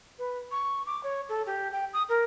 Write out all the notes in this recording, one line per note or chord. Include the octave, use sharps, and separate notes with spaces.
B4
C#6
D6
C#5
A4
G4
G5
D#6
A#4